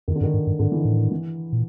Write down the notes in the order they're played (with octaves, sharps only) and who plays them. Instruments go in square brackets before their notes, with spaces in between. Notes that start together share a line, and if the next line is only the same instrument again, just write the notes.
[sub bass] F2 [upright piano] D#3
[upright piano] D3
[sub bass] G2 [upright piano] D#3
[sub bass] G#2
G2
[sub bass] G#2 [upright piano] D3
[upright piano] E3
D#3
[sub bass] A2
[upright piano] E3
[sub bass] A#2